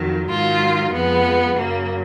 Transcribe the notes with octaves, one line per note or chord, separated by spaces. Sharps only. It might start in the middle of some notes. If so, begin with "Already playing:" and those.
Already playing: F2 D#3 F#3
G#2 D#3 F#3 F4
F2 F3 G#3 B3
F#2 C#3 F#3 A#3